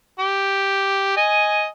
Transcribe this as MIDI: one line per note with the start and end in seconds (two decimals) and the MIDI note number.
0.19 1.17 67
1.17 1.66 75
1.17 1.66 80